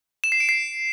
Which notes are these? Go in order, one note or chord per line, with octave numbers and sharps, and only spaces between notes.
E7
C7
D7
C7